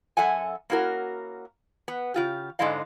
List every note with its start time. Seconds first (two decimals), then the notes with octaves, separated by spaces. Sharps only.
0.17 F#2 A4 E5 F#5 G#5
0.70 A#3 C#4 E4 F#4 A#4
1.88 B3
2.14 C#3 F4 G4
2.59 G#2 D3 G#3 E4 D#5 F5